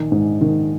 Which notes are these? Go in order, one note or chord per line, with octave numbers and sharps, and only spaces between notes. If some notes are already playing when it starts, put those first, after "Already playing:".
Already playing: A#1 D#3
G#2
D#3